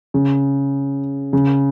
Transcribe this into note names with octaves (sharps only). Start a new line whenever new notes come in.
C#3
C#3